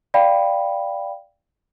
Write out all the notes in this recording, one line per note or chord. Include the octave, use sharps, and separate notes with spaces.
D5 F5 G5 B5